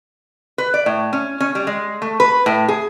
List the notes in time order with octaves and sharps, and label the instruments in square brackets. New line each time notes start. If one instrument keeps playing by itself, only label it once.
[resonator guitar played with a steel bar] B4
D5
A2
C#4
C#4
G3
G#3
A3
B4
A2
G#4